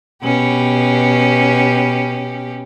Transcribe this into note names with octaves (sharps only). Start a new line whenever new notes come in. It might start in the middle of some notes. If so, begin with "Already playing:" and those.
B2 C#4 G4